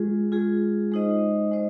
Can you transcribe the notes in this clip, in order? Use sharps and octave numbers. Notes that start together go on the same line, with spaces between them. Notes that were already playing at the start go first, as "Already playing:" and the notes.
Already playing: G#3 F4 G#4
G#3 F4 G#4
G#3 D#4 C5 D#5
G#3 D#4 C5 D#5